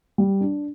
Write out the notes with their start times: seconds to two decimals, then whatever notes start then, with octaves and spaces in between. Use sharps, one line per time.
0.18 G3
0.41 D4